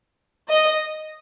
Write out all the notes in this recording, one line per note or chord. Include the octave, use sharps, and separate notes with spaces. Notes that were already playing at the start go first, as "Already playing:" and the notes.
D#5